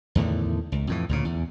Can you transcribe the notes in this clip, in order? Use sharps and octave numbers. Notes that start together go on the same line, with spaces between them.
E2 A2 D3 D#3
C#2
F2 A2 E3
D2 A#2 C#3
E2